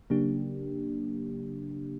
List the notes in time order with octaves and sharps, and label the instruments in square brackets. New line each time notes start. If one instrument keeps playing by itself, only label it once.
[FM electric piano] C#3 F#3 A#3 D4 G4